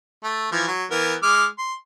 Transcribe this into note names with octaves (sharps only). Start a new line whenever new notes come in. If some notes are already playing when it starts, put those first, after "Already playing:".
A3
E3 F3
F#3
E3 B3 A#4
G#3 D6 F6
C6